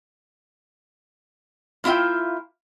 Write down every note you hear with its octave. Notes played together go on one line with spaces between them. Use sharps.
A#3 E4 F4 E5 G5